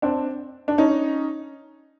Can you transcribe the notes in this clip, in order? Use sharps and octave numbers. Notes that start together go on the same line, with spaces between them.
C4 D4
D4
C#4 D#4